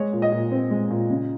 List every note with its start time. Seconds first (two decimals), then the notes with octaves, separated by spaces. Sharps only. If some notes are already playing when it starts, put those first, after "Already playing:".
Already playing: G#3 C#5
0.13 A#2
0.22 D#5
0.32 A#2
0.52 C4
0.71 G#3
0.91 A#2
1.10 C#3